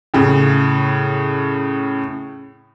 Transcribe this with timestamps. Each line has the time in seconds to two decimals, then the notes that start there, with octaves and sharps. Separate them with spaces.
0.14 A2 C#3